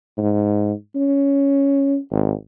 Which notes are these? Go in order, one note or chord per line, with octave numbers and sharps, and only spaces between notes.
G#2
C#4
G#1